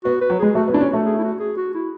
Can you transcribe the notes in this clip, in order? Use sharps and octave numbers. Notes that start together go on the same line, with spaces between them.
B3 F#4
B4
F#3
G#3 G#4
A3 F#4
B3
D4 E4
C#4
E4
A3 F#4
G#4
E4
F#4
G#4
F#4
E4